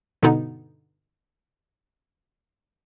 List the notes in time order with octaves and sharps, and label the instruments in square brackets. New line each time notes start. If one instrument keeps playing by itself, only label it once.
[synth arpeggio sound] G2 B2 D3 B3 D#4